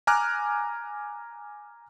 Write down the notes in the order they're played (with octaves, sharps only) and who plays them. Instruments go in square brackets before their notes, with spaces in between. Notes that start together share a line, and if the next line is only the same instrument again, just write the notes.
[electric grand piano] G#5 A#5 D6 F6 F#6